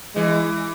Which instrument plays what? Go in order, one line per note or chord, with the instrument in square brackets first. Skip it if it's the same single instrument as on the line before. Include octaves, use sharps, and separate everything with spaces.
[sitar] E3 [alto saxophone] G#3